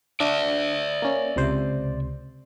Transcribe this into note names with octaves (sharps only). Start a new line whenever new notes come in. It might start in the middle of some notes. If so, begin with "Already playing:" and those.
D4 D5 E5
A#3 C#4
C#2 C3 C5